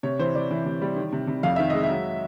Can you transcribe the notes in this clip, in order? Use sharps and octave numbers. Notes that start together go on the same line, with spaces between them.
C3 C#5
E3 C5
E3 D5
E3
C3
G3
D#3
C3
C3
F2 F5
D#3 E5
G#3 D#5
E5
F#3